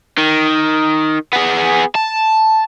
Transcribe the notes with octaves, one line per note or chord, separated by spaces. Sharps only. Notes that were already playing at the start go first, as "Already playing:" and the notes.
D#3
B3 G#4
A5